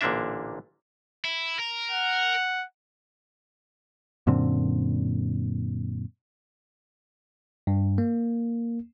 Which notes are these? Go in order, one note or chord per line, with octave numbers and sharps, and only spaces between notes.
A1 A#2 D3 A#3 D4 E5
E4
A#4
F#5
F#2 A#2 D3 C4
G2
A#3